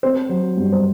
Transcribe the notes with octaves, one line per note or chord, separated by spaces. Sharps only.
C4 C5
F#3
G2
C5